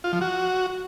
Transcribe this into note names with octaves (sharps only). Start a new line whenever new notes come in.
F4
F3
F#4